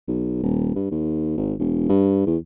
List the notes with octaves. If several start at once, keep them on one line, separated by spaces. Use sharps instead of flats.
B1
D#1
G2
D#2
G#1
E1
G2
E2